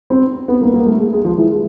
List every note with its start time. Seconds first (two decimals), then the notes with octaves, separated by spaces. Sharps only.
0.10 C4
0.48 B3
0.61 A#3
0.74 A#3
0.86 A3
0.99 G#3
1.13 G#3
1.25 F3
1.38 E3
1.51 G#3